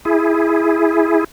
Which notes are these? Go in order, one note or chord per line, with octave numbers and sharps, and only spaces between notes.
E4 G#4